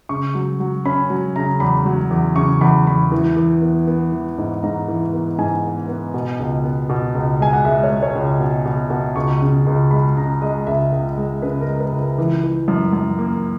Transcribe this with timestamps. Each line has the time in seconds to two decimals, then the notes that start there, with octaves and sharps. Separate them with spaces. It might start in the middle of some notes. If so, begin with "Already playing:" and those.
0.09 C#3 C#6
0.35 F#3
0.60 F#3
0.85 C#4 B5
1.10 F#3
1.36 C#3 A#5
1.60 E2 B5
1.86 F#3
2.11 E2
2.36 C#3 C#6
2.61 E2 B5
2.87 E2 B5
3.12 E3
3.37 E3
3.62 B3
3.87 B3
4.12 E3
4.38 G#2
4.63 G#2 A#5
4.88 E3
5.13 B3
5.38 G#2 G#5
5.64 B3
5.88 B3
6.14 B2
6.39 C#2
6.64 B3
6.89 B2
7.15 C#2
7.40 G#3 G#5
7.53 F#5
7.65 G#3 E5
7.83 C#5
7.91 G#3
8.03 C#5
8.15 C#2
8.40 B2
8.66 B2
8.91 B2
9.16 C#2 C#6
9.41 C#3
9.66 C#2
9.91 G#3 B5
10.16 C#3 A#5
10.41 G#3 D#5
10.67 C#2 E5
10.92 C#2
11.17 G#3
11.42 C#3 B4
11.61 A#4
11.68 G#3
11.80 B4
11.93 C#2
11.99 B4
12.18 E3
12.44 E3
12.68 F#2
12.93 F#2
13.19 A#3